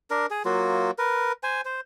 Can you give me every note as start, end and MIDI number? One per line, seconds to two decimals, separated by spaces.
0.11 0.26 62
0.11 0.26 70
0.31 0.43 68
0.45 0.91 54
0.45 0.91 58
0.45 0.91 65
0.45 0.91 66
0.98 1.32 70
0.98 1.32 71
1.43 1.61 72
1.43 1.61 80
1.65 1.81 72